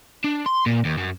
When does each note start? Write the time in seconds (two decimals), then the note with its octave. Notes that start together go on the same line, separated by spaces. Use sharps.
0.24 D4
0.46 C6
0.66 A#2
0.85 D#2
0.98 F#2